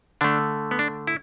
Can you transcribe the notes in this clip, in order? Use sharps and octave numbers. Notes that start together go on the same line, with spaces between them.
D3 A3 D4
B3
D4
E4